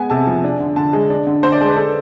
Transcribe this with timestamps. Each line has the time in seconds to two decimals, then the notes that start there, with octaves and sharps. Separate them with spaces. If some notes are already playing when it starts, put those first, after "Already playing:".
Already playing: G#3 B3 G#5
0.10 C3 A5
0.27 F3
0.44 D4
0.60 D3
0.76 D3 A5
0.93 G#3
1.10 D4
1.27 D3
1.43 D3 C5
1.52 D5
1.61 G#3 A5
1.68 B4
1.76 D4 A4